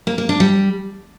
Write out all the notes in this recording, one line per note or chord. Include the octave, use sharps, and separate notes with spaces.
A#3
A#3
D4
G3